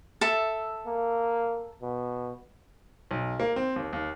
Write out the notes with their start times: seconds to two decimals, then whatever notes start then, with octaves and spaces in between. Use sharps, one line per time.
0.21 A4 E5
0.86 A#3
1.82 B2
3.11 B1
3.40 A#3
3.56 C4
3.76 D#2
3.93 D#2